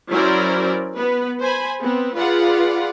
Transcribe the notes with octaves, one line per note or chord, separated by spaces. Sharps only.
F#3 C#4 E4 A#4 C5 D5
B3 B4
C5 G#5 B5
B3 C4
F4 G#4 B4 D5 F5 F#5